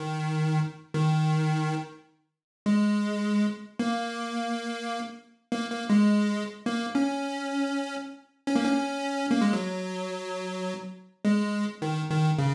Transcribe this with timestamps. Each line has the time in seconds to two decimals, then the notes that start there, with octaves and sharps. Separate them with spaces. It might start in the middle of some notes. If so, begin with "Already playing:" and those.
Already playing: D#3
0.94 D#3
2.66 G#3
3.79 A#3
5.52 A#3
5.71 A#3
5.90 G#3
6.66 A#3
6.95 C#4
8.47 C#4
8.56 A#3
8.65 C#4
9.31 A#3
9.41 G#3
9.53 F#3
11.25 G#3
11.82 D#3
12.10 D#3
12.39 C#3